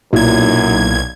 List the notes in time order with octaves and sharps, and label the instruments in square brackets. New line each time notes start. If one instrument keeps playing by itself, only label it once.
[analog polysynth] B1 G#6 [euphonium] F#2 [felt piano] A#2 [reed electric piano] D#4 E4